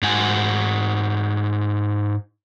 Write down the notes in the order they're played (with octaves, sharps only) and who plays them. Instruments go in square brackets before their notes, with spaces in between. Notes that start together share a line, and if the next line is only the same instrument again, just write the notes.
[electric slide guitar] G#2 F#4 G#5